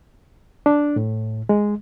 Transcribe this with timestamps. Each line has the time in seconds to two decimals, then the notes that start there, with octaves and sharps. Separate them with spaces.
0.66 D4
0.96 A2
1.49 G#3